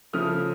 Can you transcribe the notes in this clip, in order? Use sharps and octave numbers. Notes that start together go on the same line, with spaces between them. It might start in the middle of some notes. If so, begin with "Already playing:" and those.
C#3 F3 A3 D#6 F6